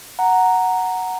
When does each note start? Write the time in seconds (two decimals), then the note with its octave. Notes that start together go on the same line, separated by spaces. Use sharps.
0.19 F#5 A#5